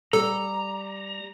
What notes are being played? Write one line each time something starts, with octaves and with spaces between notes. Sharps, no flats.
G3 A4 A#5